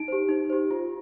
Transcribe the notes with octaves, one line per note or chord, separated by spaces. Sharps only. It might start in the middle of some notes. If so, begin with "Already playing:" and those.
Already playing: D#4 D7
G4 C5
D#4
G4 C5
F4